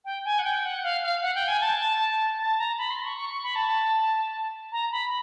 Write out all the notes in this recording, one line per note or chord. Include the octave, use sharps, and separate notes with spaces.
G5
G#5
F#5
G5
F#5
F5
F5
F#5
G5
G#5
A5
A5
A#5
B5
C6
C#6
C#6
C#6
B5
A5
A#5
B5